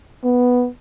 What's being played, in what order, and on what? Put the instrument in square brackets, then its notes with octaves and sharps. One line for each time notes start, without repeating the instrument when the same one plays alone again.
[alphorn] B3